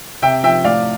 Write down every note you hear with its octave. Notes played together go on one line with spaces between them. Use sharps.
C3 E5 G5
F3 E5 G5
A2 D5 F5